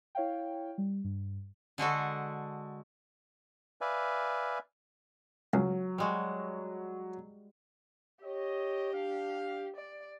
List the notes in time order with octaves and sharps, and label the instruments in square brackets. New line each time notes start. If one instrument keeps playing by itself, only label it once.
[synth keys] E4 C#5 F5 G5
G3
G2
[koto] D3 G#3 F#4 A4
[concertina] B4 D5 E5 F5 G#5
[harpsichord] C#2 [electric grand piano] F#3
[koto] G3 G#3 F#4
[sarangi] G4 [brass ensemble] C#5 D#5
[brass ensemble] D4 F5
[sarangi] D5